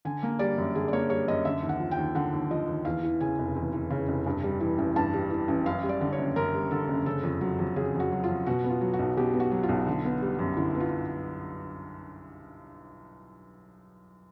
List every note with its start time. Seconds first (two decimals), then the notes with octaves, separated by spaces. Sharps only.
0.05 D3 G#5
0.23 A#3
0.39 G3 D5
0.58 F#2
0.75 D3 G#4
0.88 D5
0.93 A#3 C#5
1.10 G3 C#5
1.28 F#2 D#5
1.45 D3 E5
1.63 D#2
1.69 F#5
1.80 F3
1.91 G5
1.97 D#2
2.15 D3 F#5
2.33 D#2
2.50 F3 D#5
2.68 D#2
2.85 E2 F5
3.03 E3
3.21 C#3 G#5
3.38 F1
3.56 E2
3.73 E3
3.90 C#3
4.08 F1
4.26 G2
4.44 G3
4.60 E3
4.78 A1
4.96 G2 A5
5.13 G3
5.31 E3
5.48 A1
5.66 F#2 F5
5.83 G3
5.89 D5
6.01 D3
6.13 C#5
6.18 F#1
6.36 F#2 A#4
6.54 G3
6.71 D3 A4
6.88 F#1
7.06 C#3 A4
7.23 F2
7.41 F#3
7.59 F2
7.76 C#3 G#4
7.94 F2
8.00 F#4
8.12 F#3
8.24 F4
8.29 F2
8.46 B2 F#4
8.64 B3
8.70 F4
8.81 F#3
8.93 F#4
8.99 B1
9.17 B2 G4
9.34 B3
9.40 F#4
9.51 F#3
9.63 F4
9.69 B1
9.87 D3
10.05 B3
10.22 G3
10.39 F#2
10.57 D3 E4
10.75 B3
10.80 F4